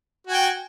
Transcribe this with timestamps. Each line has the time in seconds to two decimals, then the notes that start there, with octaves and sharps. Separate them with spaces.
0.27 F#4
0.30 G#5
0.33 G5